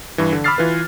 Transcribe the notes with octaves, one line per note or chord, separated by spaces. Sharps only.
G2 E3
D3
B5 D6 E6 F6 A6 C7
E3 F4 B4